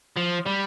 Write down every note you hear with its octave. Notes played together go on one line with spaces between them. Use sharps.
F3
G3